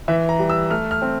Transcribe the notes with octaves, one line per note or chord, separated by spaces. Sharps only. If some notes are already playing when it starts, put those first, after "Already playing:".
E3 E5
A#5
G3
E6
A3 F6
F6
C4